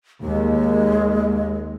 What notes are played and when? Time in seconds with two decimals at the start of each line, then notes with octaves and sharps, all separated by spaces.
0.22 D#2 G#3